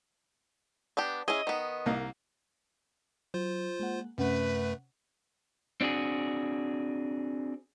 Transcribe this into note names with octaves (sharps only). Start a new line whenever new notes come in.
B3 D4 G4
C#4 E4 G#4 D#5
D#3 B3
C2 A#3
F#3 F4 C5
G#3 A#3 F#5
F#2 C3 A3 C#4 B4 F#5
C4 D4 F#4 G#4